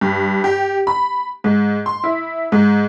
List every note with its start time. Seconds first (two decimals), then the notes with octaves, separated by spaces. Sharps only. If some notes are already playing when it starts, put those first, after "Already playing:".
0.01 G2
0.44 G4
0.87 B5
1.44 G#2
1.86 C6
2.04 E4
2.52 G#2